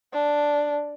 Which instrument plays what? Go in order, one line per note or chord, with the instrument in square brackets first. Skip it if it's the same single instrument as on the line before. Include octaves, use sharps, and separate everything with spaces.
[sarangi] D4